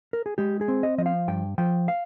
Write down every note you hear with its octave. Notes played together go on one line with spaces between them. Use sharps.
A#4
G#4
G#3 G4
G#4
C4
D#5
F3 D#5
F5
G2 G5
F3 G5
F5